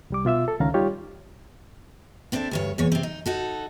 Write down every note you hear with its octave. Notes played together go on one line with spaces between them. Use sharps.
C2 G3 D6
B2 F4 E5 E6
A4
C#2 D#3 C#4 F5 A#5
G3 D#4 F4 G4 C#5
B3 C4 D4 E4 A4
D2 G2 C#5
E2 A#2 C#5
C3 C4
D#4
D#4 F#4 A4